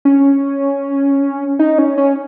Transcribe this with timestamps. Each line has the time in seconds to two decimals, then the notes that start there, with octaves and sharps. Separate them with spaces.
0.05 C#4
1.59 D#4
1.78 C#4
1.98 C#4